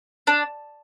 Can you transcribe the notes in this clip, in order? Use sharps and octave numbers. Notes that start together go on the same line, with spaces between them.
D4